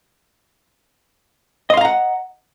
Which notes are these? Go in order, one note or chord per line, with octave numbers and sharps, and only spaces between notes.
D#5 F5 F#5 A#5 C6